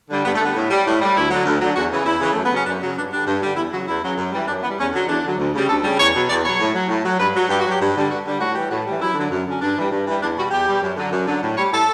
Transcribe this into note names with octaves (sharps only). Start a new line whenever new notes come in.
D3 G3
G2 B3
A3
D3 G3 B3
A2
G3
A2
G3
D2 E4
D3 F#3
D2
D3 F#3
E2 F#4
C#3 E3
E2 E4
C#3 E3
F#2 A3
B3
C#3 F#3 C#4
F#2 D4
C#3 F#3
G2 D4
D3 G3 D4
G2
D3 G3
E2 E4
C#3 F#3 F#4
E2 E4
C#3 F#3
F#2
E3 G3
F#2 D4
E3 G3 B3
E2 C#4
D3 F#3
E2 D4
D3 F#3
D2
C#3 G3
D2 A4
C#3 G3
E2 C#5
B2 F#3
E2 D5
B2 F#3 C#5
A2
F#3
A2
F#3
G2 B4
F#3
G2 G4
F#4
F#3
G4
G2
D3 G3
G2 F#4
D3 G3
A2 F#4
E3 G3 G4
A2 F#4
E3 G3
F#2 E4
D3 F#3
F#2
D3 F#3 C#4
G2 D4
E3 G3
G2
E3 G3
E2 D4
B2 G3 F#4
E2 G4
B2 G3
F#2
D3 F#3
F#2
D3 F#3
A2
G3 C#5
A2 A4